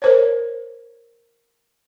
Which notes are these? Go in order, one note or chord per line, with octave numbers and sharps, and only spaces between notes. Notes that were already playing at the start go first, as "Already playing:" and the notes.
A#4 C5 C#5